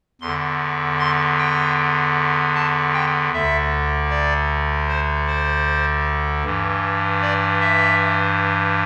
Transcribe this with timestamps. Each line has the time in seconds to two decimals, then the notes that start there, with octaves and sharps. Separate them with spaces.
0.21 E2 D3 C6
0.99 C6
1.38 G5
2.55 A5
2.94 G5
3.33 D2 D3 E5
4.10 D5
4.88 C5
5.27 C5
6.44 G2 E3
7.22 D5
7.61 E5